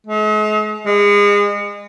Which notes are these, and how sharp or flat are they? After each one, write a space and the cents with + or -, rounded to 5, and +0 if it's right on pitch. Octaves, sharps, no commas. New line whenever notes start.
G#3 +45
G#3 -30